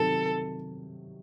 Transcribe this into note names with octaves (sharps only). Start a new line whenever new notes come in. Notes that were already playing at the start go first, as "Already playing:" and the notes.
Already playing: C3 D#3 F#3 A4